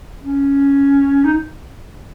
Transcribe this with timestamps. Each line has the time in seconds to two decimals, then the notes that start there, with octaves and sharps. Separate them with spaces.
0.23 C#4
1.25 D#4